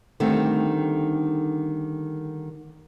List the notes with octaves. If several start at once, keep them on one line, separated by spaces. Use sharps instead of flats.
D3 D#3 G3 A3 C4